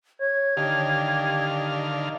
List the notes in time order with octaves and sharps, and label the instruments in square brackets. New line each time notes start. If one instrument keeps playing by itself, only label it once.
[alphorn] C#5 [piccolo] G#6
[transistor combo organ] D3 D#3 F5 [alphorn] G4